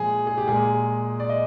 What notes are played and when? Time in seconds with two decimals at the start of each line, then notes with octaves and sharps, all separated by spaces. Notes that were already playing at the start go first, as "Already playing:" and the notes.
Already playing: A#2 F3 G#3 G#4
0.27 G#4
0.38 G4
0.48 A#2 G#3 G#4
1.20 D5
1.29 D#5